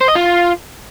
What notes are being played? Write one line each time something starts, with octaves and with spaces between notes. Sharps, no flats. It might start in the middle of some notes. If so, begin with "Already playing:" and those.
C5
D#5
F4